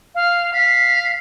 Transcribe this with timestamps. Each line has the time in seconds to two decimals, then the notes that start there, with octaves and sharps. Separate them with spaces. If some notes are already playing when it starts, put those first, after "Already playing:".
0.15 F5
0.54 F5 B6